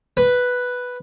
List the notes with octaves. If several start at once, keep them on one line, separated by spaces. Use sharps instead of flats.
B4